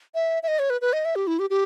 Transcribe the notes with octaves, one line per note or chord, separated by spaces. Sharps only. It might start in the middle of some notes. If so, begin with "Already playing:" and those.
E5
E5
D#5
C#5
B4
B4
D#5
E5
G4
E4
G4
G4